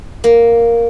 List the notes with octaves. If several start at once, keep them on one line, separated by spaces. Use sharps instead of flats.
A#3